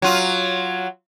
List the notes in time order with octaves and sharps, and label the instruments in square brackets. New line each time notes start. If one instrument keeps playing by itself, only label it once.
[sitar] F#3 F4